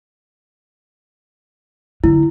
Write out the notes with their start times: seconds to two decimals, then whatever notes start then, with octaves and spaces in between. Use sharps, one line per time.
2.04 D3 E4